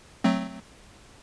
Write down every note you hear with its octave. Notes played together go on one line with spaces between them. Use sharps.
F#3 A3 C4